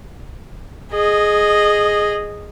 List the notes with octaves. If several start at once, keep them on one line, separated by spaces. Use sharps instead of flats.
G#4 D#5